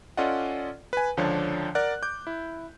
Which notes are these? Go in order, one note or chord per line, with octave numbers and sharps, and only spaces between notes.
C#4 F4 A4 D5 D#5 F#5
B4 G#5
C#2 D3 F3 D4 C#5
A#4 D5 F#5 F#6
D6 G6
E4